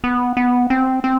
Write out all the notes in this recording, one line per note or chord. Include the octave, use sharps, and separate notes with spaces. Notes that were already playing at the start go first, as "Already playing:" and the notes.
B3
B3
C4
C4